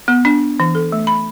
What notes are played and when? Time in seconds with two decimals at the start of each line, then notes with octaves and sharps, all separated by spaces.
0.08 B3
0.25 D4
0.60 E3
0.75 A4
0.92 A3
1.07 B5